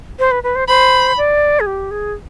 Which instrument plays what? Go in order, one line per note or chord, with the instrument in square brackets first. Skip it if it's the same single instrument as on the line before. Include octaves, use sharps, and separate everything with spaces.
[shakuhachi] C5
B4
B4
C5
[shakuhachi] C5 [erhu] B5
[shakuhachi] D5
G#4
G4
G#4